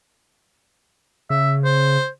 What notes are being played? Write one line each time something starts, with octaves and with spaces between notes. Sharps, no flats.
C#3 E5
C5